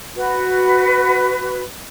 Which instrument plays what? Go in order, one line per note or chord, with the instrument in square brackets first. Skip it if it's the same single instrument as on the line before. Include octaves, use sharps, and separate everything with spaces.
[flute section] F#4 B4